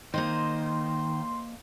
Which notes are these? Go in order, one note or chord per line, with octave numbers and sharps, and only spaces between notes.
D#3 A#3 C5 D#5 C6